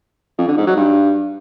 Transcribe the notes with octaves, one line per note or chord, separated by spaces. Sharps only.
F2
D3
G#2
F#3
G2